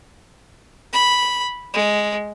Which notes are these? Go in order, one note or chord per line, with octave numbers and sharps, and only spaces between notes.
B5
G#3